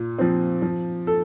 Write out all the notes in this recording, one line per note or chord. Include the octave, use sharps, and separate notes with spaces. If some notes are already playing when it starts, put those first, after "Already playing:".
Already playing: A#2
F3 C4
F3
A4